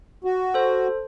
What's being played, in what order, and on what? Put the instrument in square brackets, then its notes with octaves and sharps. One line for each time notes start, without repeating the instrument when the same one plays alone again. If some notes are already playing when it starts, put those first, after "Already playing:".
[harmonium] F#4
[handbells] A4 C5